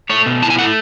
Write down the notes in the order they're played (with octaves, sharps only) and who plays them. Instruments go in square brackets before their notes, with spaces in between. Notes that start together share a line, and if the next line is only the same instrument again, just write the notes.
[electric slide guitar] A3 C#5
B2
E4 A5
G#5
A3 F#5